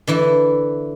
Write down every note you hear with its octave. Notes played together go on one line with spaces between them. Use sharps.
D3 E3 E4